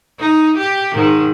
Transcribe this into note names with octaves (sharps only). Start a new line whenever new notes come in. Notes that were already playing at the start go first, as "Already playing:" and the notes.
D#4
G4
G#2 D#3